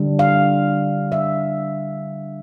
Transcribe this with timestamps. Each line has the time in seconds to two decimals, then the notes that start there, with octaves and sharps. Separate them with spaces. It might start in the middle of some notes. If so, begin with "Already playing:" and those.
Already playing: D3 G3 D4
0.19 F5
1.12 E5